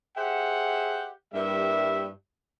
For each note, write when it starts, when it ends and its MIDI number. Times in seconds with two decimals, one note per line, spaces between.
0.17 1.10 67
0.17 1.10 68
0.17 1.10 72
0.17 1.10 76
0.17 1.10 78
1.33 2.09 43
1.33 2.09 55
1.33 2.09 58
1.33 2.09 64
1.33 2.09 76